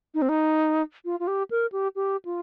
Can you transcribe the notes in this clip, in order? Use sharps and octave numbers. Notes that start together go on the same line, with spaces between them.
D#4
C4
D#4
F4
F4
G4
A#4
G4
G4
F4